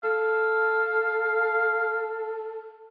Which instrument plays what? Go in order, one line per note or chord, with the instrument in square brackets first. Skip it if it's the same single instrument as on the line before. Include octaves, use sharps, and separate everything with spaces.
[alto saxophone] A4 [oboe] F5